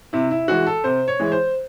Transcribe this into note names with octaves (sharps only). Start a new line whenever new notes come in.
C3 E4
E4
E3 G#3 F#4
A4
C3 C5
C#5
E3 G#3
C5